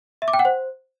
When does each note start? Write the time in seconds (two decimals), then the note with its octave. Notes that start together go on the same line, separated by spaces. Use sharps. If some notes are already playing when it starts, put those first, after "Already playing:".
0.22 E5
0.28 D6
0.33 G5
0.39 F#5
0.45 C5